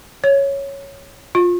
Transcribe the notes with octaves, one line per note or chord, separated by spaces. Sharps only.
C#5
F4